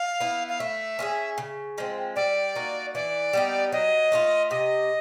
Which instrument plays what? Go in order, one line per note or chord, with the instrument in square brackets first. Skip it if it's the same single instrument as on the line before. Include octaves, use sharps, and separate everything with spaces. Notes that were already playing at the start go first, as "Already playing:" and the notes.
Already playing: [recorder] F5
[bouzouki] B3 E4
[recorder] F5
[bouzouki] A3 [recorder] E5
[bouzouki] C#4 F4 G#4
C#3
F3 G#3 C4
[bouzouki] G3 [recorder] D5
[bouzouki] A#3 D#4 F#4
[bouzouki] E3 [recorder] D5
[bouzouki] G3 B3 D#4
[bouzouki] F#3 [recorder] D#5
[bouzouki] A3 D4 F4
[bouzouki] C3 [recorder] D#5